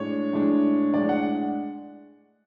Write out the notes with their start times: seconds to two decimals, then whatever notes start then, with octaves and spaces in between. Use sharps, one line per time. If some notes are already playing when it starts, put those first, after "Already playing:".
Already playing: A2 G#3 D4 C#5
0.33 A2 G#3 D4
0.94 A2 G#3 D4 D5
1.09 F#5